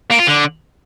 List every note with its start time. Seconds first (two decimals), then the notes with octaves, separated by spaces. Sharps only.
0.10 A#3
0.19 F4
0.27 D3